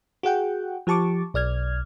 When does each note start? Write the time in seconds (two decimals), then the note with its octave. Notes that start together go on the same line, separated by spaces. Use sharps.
0.23 F#4 G#4 F#5 G5
0.87 F3 G4 A5 C#6 D6
1.34 B1 D5 F6 G#6